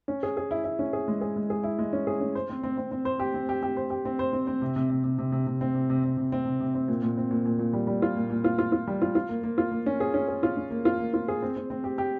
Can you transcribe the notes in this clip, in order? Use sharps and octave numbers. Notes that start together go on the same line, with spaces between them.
C#4
G#4
G#4
E4
E4
C#4
G#4
G#3
G#4
G#3
G#4
E4
G#3
C#4
G#4
C#4
C5
C4
C4
C4
C4
C5
G4
C4
G4
G4
C5
G4
C4
C5
C4
C4
C3
C3
C3
C3
C3
C3
C3
C4
C3
C3
C3
C3
C4
C3
C3
C4
A#2
A#2
C4
A#2
A#2
A#2
G3
G3
F4
A#2
A#2
F4
F4
F4
G3
F4
F4
A#3
A#3
F4
A#3
C#4
G#4
C#4
G#4
F4
C#4
A#3
F4
A#3
F4
G#4
C4
C4
C4
G4
G4